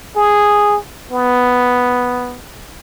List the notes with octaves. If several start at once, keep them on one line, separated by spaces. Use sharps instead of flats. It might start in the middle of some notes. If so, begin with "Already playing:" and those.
G#4
B3